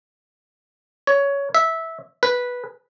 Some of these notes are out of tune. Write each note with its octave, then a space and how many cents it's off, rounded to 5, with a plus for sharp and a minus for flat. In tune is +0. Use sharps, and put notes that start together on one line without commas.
C#5 +15
E5 -15
B4 -10